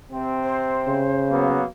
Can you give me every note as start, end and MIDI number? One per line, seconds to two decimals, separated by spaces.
0.12 1.00 48
0.12 1.00 60
0.43 1.47 72
0.87 1.62 49
1.30 1.65 54
1.30 1.65 58
1.30 1.65 59